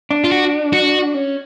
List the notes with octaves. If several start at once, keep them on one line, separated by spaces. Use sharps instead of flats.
D4
F4
F#4
F#4
C#4